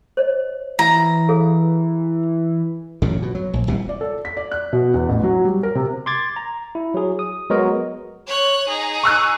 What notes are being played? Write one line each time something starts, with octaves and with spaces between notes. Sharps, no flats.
C5 C#5 D#5
E3 A#5
G#4 A4 F5
A1 F#2 A#2 C#3
B2
F#3
A#1
D#1 C2 B2
D5
A4
B6
D5
F#6
B2
E2
A1
F#3
G3
A#4
C3
C6 D6 G#6 A6
A#5
E4
F#3 G#4
D#6
F#3 G#3 B3 F#4 A#4 D#5
C#5 F#6
D#4 G#4
C#6 E6 F#6